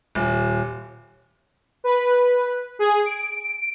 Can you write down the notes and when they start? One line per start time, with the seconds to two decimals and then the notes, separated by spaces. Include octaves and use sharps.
0.15 D#1
1.84 B4
2.79 G#4
3.06 D7